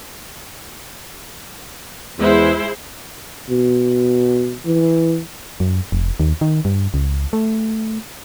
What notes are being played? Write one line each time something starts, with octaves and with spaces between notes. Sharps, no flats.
E2 G#3 E4 C5
B2
E3
F#2
F1
D#2
D#3
G2
C#2
A3